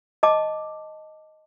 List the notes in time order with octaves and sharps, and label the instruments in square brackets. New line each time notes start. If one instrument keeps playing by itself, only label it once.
[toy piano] D#5 A5 D6